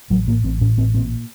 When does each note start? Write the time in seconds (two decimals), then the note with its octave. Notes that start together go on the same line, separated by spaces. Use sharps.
0.10 A1 F#3
0.27 A2 A#3
0.44 A1 C4
0.61 A2 C#4
0.77 A1 C4
0.94 A#2 C4